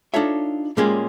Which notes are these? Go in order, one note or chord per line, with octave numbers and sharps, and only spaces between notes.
D4 D#4 F4 A4 C#5 E5
A#2 G3 G#3 A#3 C#4 G#4